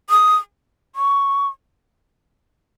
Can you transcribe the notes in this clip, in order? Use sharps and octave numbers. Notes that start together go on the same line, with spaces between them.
D#6
C#6